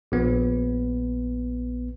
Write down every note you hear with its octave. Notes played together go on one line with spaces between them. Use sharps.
A#1 B3